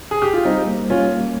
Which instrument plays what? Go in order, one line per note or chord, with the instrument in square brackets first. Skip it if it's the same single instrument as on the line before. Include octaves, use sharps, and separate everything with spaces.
[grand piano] G#4
G4
F4
[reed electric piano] G3 [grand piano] C4 D#4
[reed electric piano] A#3
[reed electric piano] G3 [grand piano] C#4 F4
[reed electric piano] A#3